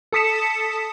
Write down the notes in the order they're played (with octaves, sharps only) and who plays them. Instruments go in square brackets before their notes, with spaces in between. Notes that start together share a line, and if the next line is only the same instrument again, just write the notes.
[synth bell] A4 A5 D#6 B6 C#7 E7